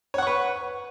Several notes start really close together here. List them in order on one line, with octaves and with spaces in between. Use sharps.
C#5 F#5 C#6 B4